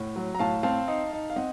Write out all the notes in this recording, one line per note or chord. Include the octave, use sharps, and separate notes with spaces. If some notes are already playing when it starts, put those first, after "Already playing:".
Already playing: A2 F#5
F#3
A#5
A2 F5 A5
C4 F5 A5
D#4
D#4
F5
C4 D#5 F#5